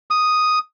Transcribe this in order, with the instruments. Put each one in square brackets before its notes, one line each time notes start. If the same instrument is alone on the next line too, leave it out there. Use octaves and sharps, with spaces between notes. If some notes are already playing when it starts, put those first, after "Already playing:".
[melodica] D#6